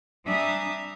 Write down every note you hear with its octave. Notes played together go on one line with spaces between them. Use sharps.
G3 D4 E5 G#5 A#5 D#6